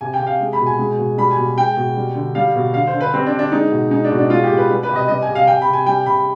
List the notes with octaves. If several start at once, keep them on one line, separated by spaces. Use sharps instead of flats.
C3 G#5
G5
C3
F5
G#3
B5
B2
G#5
G#3
B2
G3 B5
G#5
B2
G#3 G5
B2
G3
D3
G3 F5
B2
D3 F5
C5
D3
B4
G3 C4
D4
D3
D4
G#3 D#4
B2
G#3 D#4
D4
B2
D4
G#3 F4
G4
B2
B4
G3
B4
C3
D#5
G3 D#5
G#5
C3
F5
C3 G5
B5
C3
G#5
G3 G5
C3 B5